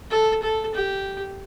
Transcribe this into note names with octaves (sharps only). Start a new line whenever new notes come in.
A4
A4
G4